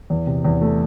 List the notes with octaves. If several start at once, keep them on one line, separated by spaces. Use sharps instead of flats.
E2
C3
E2
A3